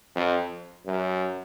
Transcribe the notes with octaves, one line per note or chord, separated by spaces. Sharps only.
F2
F#2